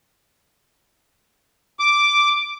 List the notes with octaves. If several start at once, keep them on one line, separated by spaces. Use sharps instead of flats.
D6